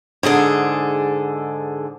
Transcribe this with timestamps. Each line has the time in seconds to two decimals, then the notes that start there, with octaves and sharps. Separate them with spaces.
0.23 G#2 D3 G#4 A4